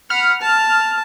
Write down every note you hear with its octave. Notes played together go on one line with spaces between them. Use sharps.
F#5 B5 F6
A5